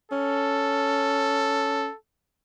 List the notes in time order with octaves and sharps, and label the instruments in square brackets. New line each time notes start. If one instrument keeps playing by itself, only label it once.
[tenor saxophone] C#4 [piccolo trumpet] A4